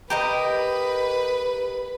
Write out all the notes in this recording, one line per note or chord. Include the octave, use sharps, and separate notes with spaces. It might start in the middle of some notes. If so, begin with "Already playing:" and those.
G4 A#4 B4 D#5